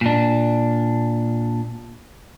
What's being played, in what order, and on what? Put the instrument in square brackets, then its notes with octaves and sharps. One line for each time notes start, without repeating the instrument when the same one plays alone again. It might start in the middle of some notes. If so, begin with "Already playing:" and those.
[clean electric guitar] A#2 D4